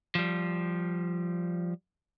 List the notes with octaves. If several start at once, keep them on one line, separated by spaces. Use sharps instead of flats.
F3 G3